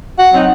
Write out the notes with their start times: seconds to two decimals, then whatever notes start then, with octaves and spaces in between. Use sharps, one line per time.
0.19 F#5
0.33 F#3 C4 D#4